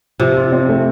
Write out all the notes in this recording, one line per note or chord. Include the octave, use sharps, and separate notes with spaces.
C3 F3
F4
C4
A3